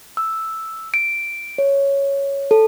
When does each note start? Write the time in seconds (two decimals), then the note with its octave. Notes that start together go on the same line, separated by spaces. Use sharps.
0.17 E6
0.94 D7
1.58 C#5
2.51 A4